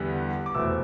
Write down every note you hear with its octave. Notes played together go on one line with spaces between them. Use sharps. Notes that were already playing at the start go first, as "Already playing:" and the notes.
Already playing: E2 D3 G3 B3
D6
F1 E2 B2 A3 C4 E6